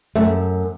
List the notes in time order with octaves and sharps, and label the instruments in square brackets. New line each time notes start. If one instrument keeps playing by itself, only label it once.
[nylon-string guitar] F#2 A3